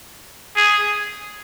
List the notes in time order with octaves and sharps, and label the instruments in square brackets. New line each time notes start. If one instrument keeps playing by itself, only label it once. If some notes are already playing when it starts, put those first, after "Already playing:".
[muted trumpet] G#4